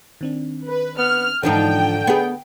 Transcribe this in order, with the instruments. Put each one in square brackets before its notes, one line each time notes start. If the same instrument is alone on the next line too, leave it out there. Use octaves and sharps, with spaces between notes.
[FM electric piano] D#3 C4 D4
[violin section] B4
[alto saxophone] B3 [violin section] F6
[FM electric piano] G#2 E3 [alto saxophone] D3 [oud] F3 D4 D#4 [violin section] G5
[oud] B3 G#4